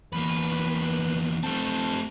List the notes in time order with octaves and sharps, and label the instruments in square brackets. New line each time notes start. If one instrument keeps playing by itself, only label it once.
[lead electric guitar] E2 A#3 [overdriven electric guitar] B4
[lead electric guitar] A3 C4 [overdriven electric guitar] G4 A5